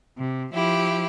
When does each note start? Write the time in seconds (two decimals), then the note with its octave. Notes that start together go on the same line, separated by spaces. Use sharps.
0.18 C3
0.54 F3 E4 G4